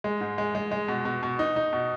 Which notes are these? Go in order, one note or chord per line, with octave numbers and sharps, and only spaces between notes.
G#3
G#2
G#3
G#3
G#3
B2
B2
B2
D#4
D#4
B2